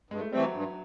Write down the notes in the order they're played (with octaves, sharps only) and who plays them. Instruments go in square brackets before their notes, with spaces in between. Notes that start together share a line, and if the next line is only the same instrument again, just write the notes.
[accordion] G2 [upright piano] G#3
[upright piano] A3
[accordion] E3 A3 C4 [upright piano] G3
[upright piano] F#3
[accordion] G2